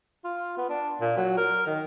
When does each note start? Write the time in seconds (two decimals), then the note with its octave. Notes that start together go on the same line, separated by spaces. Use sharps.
0.25 F4
0.58 B3
0.70 D4
1.01 A#2
1.17 F#3
1.38 A#4
1.67 D#3